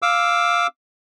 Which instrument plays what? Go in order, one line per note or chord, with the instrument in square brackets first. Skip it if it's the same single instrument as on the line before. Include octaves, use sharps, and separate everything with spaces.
[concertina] F5 D6 E6